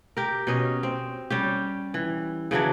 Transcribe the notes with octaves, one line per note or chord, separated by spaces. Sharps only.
G4 A#4
B2 C#4 D#5
C4
G3 C#4 G4
E3
C#3 E3 F#3 D4